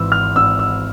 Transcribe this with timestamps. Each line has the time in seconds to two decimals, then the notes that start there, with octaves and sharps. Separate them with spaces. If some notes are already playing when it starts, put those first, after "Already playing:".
Already playing: G#1 G#2 E3 E6
0.12 F6
0.36 G#1 E6
0.59 E6